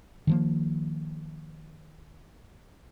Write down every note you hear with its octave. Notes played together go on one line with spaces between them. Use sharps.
D#3 F3 A#3